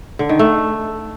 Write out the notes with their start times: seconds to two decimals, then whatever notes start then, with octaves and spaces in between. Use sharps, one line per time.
0.19 D3
0.29 D#3
0.39 A3